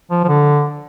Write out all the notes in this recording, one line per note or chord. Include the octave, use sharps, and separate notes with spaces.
F3
F3
D3